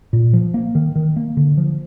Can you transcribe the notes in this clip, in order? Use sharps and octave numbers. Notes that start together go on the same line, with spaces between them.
A#2
F3
A#3
D#3
D#3
A#3
D3
F3